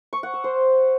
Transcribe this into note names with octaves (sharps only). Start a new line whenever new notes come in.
C#6
F#5
E6
C5